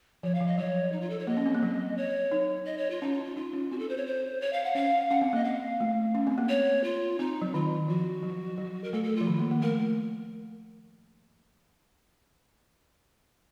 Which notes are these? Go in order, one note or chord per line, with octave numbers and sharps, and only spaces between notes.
F3 C#5
F5
F3
D#5
F#3 C#5
D#4
F4
A4
C#5
A#3 D#5
C#4
C4
A#3
F#3
C#5
D#4
D#5
C#5
F4
C#4 D#4
F4
F4
D#4 F4
C#4
C4 F#4
A4
C5
C#5
C5
C#5
F5
F#5
C#4 F5
C#4 F#5
C4
A#3 D#5
F5
A3
C#4
C4
A#3
C#5
F4
C4 D#4
F#3
D#3 F4
F3 F#4
F#3
F#3
A#4
A3 A4
A4
F3 F4
D#3
A#3
A#3
A3 A#4